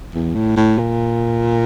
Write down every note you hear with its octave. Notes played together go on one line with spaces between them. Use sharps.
E2
A2
A2
A#2